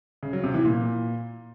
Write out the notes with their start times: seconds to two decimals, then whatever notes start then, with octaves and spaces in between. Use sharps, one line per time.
0.23 C#3
0.33 F#3
0.44 C3
0.54 E3
0.65 A#2